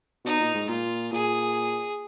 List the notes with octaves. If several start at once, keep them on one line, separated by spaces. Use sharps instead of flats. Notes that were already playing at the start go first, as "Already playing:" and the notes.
B2 D#4
A#2
G#2
A#2 F4
A#2 G#4